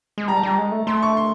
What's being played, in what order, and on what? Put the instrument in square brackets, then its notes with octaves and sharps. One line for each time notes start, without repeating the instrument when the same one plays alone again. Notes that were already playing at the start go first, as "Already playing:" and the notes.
[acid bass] G#3
[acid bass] G3 [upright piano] A#5
[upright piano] A5
[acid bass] G3 [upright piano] A#5
[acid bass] G#3
A3
[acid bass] A3 [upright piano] C6
[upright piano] C#6
C6